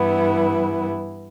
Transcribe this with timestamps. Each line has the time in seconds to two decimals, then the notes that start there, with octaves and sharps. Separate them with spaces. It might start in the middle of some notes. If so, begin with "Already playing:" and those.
Already playing: G2 E3 B3 E4